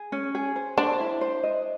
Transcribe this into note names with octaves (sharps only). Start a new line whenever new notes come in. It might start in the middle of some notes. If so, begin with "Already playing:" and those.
Already playing: G#4
C#4
G#4
C5
D4 C5
E4
C5
D#5